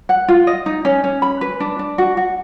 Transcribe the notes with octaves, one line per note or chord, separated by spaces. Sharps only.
F#5
F4
D#5
D#4
C#4
C#4
B5
B4
D4
D4
F#4
F#4